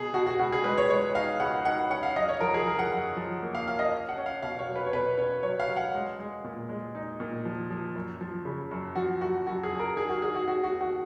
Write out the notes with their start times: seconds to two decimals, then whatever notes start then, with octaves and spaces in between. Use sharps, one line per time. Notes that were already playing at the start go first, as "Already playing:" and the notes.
Already playing: B2 G#4
0.14 B2 F#4
0.27 F#4
0.39 C#2 F#4
0.52 G#4
0.64 G#3 B4
0.78 C#5
0.89 G#3 C#5
1.14 D#4 F5
1.40 C#2 F#5
1.65 D#4 F#5
1.90 C#4 F#5
2.03 F5
2.16 F#2 D#5
2.29 C#5
2.40 F3 A#4
2.54 G#4
2.66 F3 A#4
2.79 F#5
2.92 F#2
3.17 F3
3.42 A#3
3.55 F5
3.67 C#4 F5
3.79 D#5
3.93 C#4
4.09 F#5
4.18 C#4
4.26 F5
4.43 B2 F5
4.59 C#5
4.68 F#3
4.76 B4
4.86 C#5
4.93 B2 B4
5.18 C#4 C#5
5.43 F#3 C#5
5.60 F5
5.69 F#3
5.76 F#5
5.94 G#3
6.19 G#3
6.44 A#2
6.69 G#3
6.95 D#4
7.20 A#2
7.45 F3
7.71 F3
7.96 F#2
8.21 F3
8.45 C#3
8.71 F#2
8.95 F3 F#4
9.21 F#2 F#4
9.47 F#2 F#4
9.63 G#4
9.71 F#2
9.79 A#4
9.97 D#3 G#4
10.09 F#4
10.22 D#3 G#4
10.35 F#4
10.47 D#2 F#4
10.64 F#4
10.73 D#3
10.81 F#4